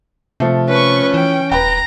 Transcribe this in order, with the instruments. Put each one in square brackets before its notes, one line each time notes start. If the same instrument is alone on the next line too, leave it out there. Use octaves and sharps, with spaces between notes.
[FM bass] C3 [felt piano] F3 A3
[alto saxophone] C#4 [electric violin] B4 C#6
[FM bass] E3 [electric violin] G5
[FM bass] D#1 [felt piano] B4 G5 [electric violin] A#5